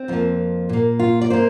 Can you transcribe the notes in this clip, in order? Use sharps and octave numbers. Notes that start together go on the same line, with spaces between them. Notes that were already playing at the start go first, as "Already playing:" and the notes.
Already playing: C4
F2 F3 A#3
A#2 A#3
F4
D5
C3 A#3 C5